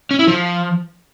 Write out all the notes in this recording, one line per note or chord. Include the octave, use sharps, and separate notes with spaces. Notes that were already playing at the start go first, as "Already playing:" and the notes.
C#4
E4
F3